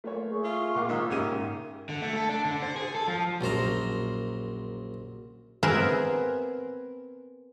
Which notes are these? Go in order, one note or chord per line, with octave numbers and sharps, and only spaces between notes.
A3 A#3 C#5
G#4 E5 C#6
F4
A#2 A#4 F5 F#5 B5 C#6 D6
G#2 D#3 D#4 A#5 D#6 E6
G#2 C#3 G4 A#4 E5 D#7
D3
A3
A4
D4
D3
C5
G#4
A4
F3
A#1 F#2 C5 A#5
B3 C4 G#4 A#4 E5